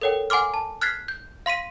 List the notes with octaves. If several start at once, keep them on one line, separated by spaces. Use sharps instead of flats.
A4 A#4 C#5 F#5 G5
F#5 G#5 C6 D6 F6
A5
F6 F#6 G#6 A6 B6 C7
G6
F5 C6 B6 D#7